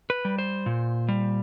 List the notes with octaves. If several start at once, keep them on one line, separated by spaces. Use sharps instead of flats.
B4
G3
C5
A#2
G3